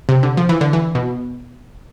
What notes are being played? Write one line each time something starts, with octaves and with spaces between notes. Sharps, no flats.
C3
D3
F3
E3
D3
E3
B2